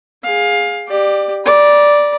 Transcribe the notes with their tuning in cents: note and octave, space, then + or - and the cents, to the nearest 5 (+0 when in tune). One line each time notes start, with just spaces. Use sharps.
G#4 -10 F5 +20
G4 +0 D5 +25
D5 +0 A#5 +45